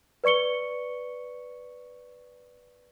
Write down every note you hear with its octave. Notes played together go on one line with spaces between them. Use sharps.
B4 D5 C#6 C#7 G7